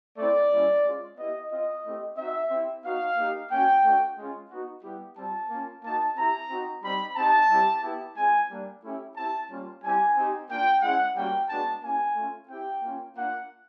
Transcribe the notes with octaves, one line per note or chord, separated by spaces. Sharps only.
A3 C4 E4 D5
G3 A#3 C#4 E4
G#3 C#4 F4
B3 E4 G4 D#5
C4 F4 D#5
A3 C4 E4 G4
C4 D#4 F#4 E5
C4 E4 G4
B3 D#4 F#4 F5
A#3 D#4 G4
A#3 C#4 F#4 G5
A3 D4 F#4
G#3 C#4 F4
B3 D#4 F#4
G3 B3 E4 G4
G3 C4 F4 A5
A#3 C#4 F4
A#3 D#4 F#4 A5
C4 E4 G4 A#5
C4 D#4 F#4
G3 C4 D#4 B5
C4 D#4 G4 A5
G3 C4 E4 G4
B3 E4 G4
G#3 C4 F4 G#5
G3 A#3 D4
A3 C#4 E4 G4
C4 E4 G4 A5
G3 A#3 C#4 F4
G3 C4 E4 G4 G#5
C4 D#4 G4
A#3 D4 F4 G5
G#3 C#4 E4 F#5
G3 A#3 C#4 F#4 G5
G#3 B3 D4 F#4 A5
A#3 C#4 E4 G4 G#5
A3 C#4 F4
C4 E4 G4 G5
A#3 C#4 F4
A#3 D4 F4 F#5